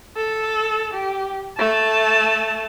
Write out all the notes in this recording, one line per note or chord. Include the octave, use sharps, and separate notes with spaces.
A4
G4
A3 A5